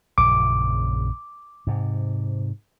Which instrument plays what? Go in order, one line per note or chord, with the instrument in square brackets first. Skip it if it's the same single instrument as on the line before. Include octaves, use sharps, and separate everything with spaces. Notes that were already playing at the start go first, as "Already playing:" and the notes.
[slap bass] A#1 F#2 C#3 [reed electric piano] D6
[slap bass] G#2 C3